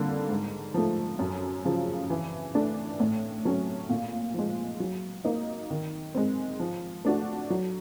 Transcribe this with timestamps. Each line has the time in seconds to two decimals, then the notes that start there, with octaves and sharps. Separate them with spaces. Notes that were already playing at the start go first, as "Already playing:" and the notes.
Already playing: F2 D3 G3 A#3
0.29 G#2
0.74 F3 A3
1.19 F#2
1.65 C#3 F3
2.10 E3
2.55 A3 D4
3.00 A2
3.45 F#3 A3 C#4
3.90 A#2
4.34 F3 G#3
4.80 F#3
5.25 A#3 D#4
5.70 D#3
6.15 G#3 C4
6.60 F3
7.05 A3 D4 F#4
7.50 F#3